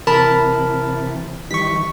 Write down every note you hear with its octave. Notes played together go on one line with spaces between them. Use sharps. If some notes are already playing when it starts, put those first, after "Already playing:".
C3 E3 A#4 A5 B5
D#3 E3 G3 C#6 B6